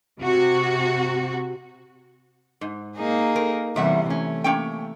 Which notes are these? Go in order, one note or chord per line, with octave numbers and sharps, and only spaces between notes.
C3 F#4
G#2
A#3 D#4 G#4
A#4
E2 C3 E3 G3 E5 F#5
A3 C#4
A#3 C#4 G5